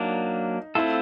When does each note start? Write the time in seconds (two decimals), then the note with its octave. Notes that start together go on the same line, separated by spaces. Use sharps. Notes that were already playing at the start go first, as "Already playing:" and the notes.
Already playing: F#3 A#3 D4 D#4
0.75 A3 C4 E4 F4 A4